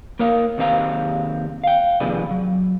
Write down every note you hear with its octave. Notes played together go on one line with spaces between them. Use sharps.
A#3 A#4 C#5 F5
D#2 C3 C4 F5 A#5
F5 G5
D#2 C3 F3 G#4 B4 D5
F#3